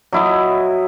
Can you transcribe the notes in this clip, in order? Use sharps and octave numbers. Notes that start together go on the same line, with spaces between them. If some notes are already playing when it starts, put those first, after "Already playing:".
F#3 E4 D#5